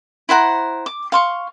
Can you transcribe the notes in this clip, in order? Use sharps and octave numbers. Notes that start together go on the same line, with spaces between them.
E4 C5 F#5 A#5
D6
F5 C6 C#6